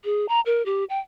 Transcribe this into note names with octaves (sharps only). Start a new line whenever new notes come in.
G#4
A#5
A#4
G4
G5